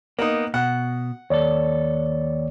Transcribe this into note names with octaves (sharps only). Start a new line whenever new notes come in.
A#3 B3 D#4
B2 F#5
D#2 A4 C#5 D5